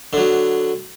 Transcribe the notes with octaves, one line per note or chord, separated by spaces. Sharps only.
D3 F#3